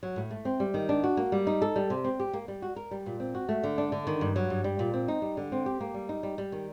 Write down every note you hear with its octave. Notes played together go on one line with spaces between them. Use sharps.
F#3
A2
A3
C4
G3
D#3
D4
F#4
A#3
G3
D#4
A4
G3
C3
C4
G4
A#3
G3
F#4
A#4
G3
A#2
C4
F#4
A3
D3
D4
D3
D#3
G2
F#3
G2
G3
A#2
C4
D#4
G3
D3
C4
G4
A#3
G3
D#4
G3
G3
D#3